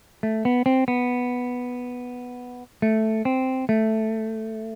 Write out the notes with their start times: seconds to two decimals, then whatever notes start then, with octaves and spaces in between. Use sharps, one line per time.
0.23 A3
0.45 B3
0.66 C4
0.88 B3
2.82 A3
3.25 C4
3.69 A3